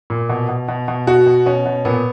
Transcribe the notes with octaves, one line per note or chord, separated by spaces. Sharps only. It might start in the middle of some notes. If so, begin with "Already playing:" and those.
A#2
B2
B2
B2
B2
B2 F#4
B2
B2 C#4
B2
A#2 B3